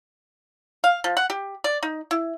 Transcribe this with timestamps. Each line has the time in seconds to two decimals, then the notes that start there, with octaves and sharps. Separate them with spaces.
0.84 F5
1.04 F3
1.17 F#5
1.30 G4
1.64 D5
1.83 D#4
2.11 E4